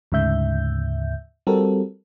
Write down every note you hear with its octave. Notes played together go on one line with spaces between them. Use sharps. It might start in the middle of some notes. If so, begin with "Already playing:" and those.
D2 G#2 C#3 E5 G6
G3 C4 F#4 A4 A#4